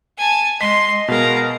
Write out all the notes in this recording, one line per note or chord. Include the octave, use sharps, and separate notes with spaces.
G#5 A5
G#3 D#5 C6 B6
B2 G#3 A#4 F5 A#5